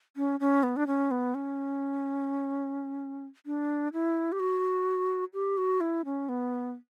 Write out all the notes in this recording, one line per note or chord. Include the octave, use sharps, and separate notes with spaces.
C#4
C#4
B3
D4
C#4
B3
C#4
D4
E4
G4
F#4
G4
F#4
E4
C#4
B3